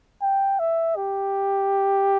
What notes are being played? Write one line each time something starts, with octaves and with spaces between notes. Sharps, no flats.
G5
E5
G4